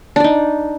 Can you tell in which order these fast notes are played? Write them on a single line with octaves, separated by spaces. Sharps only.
D4 D5 D#4